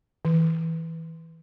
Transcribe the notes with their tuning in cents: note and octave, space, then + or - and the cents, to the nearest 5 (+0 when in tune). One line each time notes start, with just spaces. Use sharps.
E3 -20